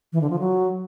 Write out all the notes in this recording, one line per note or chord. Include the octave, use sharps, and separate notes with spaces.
E3
D3
F3
F#3